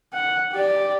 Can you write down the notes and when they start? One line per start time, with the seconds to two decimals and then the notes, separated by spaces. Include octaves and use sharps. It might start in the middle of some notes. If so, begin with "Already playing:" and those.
0.13 F#5
0.53 G4 D5